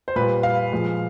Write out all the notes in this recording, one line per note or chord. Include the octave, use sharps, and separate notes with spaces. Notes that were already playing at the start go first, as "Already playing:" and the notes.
C5
A#2 G3 B4
F5
A#2 F3 G#3